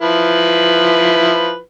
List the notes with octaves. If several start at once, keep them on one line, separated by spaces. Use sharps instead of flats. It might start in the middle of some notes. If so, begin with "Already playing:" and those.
F3 E4 B4